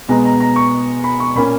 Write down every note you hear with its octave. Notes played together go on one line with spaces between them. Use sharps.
B2 G#3 B3 A#5
A#5
A#5
C#6
B5
C#6
A#2 A#3 C#4 B5